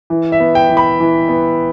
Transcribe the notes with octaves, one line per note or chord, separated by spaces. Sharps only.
E3
E5
B3
G5
E3
B5
E3
B3